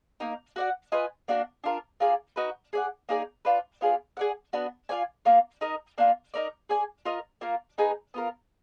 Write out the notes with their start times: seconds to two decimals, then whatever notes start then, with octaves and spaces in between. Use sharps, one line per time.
0.20 A#3 D#4 A#4
0.56 F#4 D5 F#5
0.92 F4 B4 D#5 G#5
1.28 A#3 D4 F#4 D5
1.64 D4 F4 A#4
2.00 A#3 F4 G#4 D5
2.36 D#4 F#4 B4
2.73 G#4 D5 F#5
3.09 A#3 D#4 G#4 D5
3.45 D4 F4 B4
3.81 B3 F4 G#4 D5
4.17 G#4 D5 F#5
4.53 B3 D4 F#4
4.89 F4 G#4 D5 G#5
5.25 A#3 F4 A#4 F5
5.61 D#4 A#4 D#5
5.98 A#3 D4 F4
6.34 D#4 A#4 D5
6.69 G#4 D5 G#5
7.05 F4 A#4 D#5
7.41 A#3 F4 A#4
7.78 A#3 D#4 G#4 B4
8.14 B3 F4 A#4